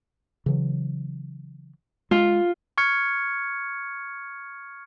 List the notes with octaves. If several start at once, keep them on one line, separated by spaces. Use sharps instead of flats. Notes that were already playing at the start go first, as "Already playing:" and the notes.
C#3 E3 F#3
G#3 F4
C#6 F6 G#6 C#7